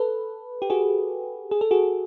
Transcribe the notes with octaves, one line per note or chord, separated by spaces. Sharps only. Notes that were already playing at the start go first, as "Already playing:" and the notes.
Already playing: A4 B4
G4
F#4 G#4
G#4
A4
F#4 G#4